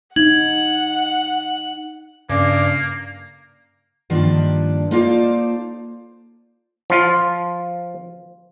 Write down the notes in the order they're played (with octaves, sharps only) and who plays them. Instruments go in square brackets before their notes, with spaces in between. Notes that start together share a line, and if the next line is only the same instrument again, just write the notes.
[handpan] D#4 [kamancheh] F#5 [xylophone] G#6 [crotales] F#7
[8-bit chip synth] G2 [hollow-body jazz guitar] C#3 [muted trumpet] A#3 [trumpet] D5
[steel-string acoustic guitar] G2 D#3 F3 A#3 D4 G4
A#3 D#4 F4 A4 C5 D5
[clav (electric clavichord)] F3 F4